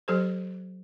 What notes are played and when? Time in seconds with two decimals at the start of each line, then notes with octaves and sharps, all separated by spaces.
0.08 F#3 G4 A4 C5